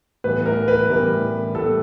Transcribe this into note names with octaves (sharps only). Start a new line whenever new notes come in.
A2 E3 G3 B3 B4
A#4
B4
A2 E3 G3 B3 A#4
A2 E3 G3 B3 A4